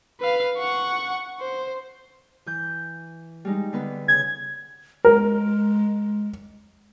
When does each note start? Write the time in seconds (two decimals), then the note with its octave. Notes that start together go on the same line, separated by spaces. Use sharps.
0.21 B4 F5
0.58 F#5 C#6
1.40 C5
2.46 E3 G6
3.45 G3 G#3 D#4
3.73 D3 B3 B4
4.08 C#3 G#6
5.05 G#3 A#4